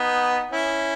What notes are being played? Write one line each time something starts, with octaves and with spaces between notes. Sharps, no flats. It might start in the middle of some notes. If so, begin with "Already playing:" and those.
Already playing: B3 D#4
C#4 E4